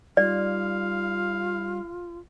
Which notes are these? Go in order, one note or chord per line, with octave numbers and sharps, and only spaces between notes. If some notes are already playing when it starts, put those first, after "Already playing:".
G3 D#4 F4 D5 F5